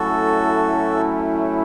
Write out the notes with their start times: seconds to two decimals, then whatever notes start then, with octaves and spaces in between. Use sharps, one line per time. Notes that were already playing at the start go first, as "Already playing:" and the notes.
Already playing: A2 F#3 A3 C#4 E4 F#4 A4